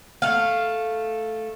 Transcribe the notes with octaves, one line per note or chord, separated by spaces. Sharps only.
A3 F5